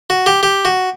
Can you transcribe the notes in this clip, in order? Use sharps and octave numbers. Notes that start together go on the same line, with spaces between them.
F#4
G4
G4
F#4